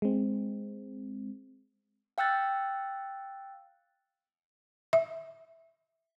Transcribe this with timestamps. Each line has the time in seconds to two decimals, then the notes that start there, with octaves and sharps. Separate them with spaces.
0.02 G#3 C4
2.18 F5 G5 E6 F#6 A6
4.93 E5